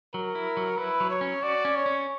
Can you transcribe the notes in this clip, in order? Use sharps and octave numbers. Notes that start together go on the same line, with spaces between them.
F#3 A#4
E4
F#3
E4 B4
F#3
C#5
C#4
F#4 D5
C#4
C#5
C#4